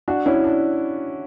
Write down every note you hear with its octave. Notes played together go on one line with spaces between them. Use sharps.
D4 F#4
C#4 E4
D4